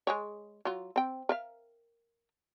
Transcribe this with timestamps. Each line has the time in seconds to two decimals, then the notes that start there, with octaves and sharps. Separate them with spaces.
0.07 G#3 G#4 C#5
0.65 F#3 F4
0.96 C4 G5
1.29 A#4 E5 F5